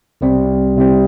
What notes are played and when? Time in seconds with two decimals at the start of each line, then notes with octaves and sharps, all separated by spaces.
0.21 C2 C3 G3 C4
0.76 C2 C3 G3 C4